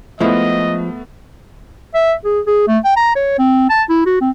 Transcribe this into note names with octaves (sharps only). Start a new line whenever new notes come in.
F3 G#3 A3 B3 E4 D#5
E5
G#4
G#4
A3
G5
A#5
C#5
C4
A5
E4
F#4
C4